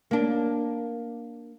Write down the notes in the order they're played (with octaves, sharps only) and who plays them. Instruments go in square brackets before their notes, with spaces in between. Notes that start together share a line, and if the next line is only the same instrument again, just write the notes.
[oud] A#3 D4